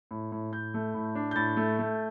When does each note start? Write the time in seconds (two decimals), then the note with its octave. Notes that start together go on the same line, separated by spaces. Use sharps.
0.11 A2
0.32 A2
0.52 A2 G6
0.74 A3
0.94 A2
1.15 D4
1.31 G6
1.36 A2 A6
1.57 A3
1.79 A3